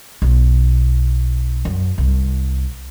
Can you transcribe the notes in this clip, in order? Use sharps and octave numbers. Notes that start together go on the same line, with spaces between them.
B1
F#2
C2